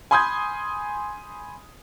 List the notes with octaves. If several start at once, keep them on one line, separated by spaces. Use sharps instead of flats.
G#5 B5 C6 D#6 G6 G#6